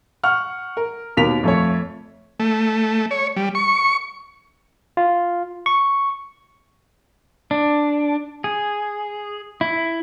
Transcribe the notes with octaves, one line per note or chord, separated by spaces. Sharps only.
F#5 C#6 F6
A#4
D#2 B2 A#4 B6 F7
F2 A3 C#5
A3
C#5
G3
C#6
F4
C#6
D4
G#4
E4